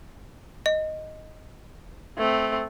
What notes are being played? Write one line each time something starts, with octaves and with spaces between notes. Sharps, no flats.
D#5
A3 C4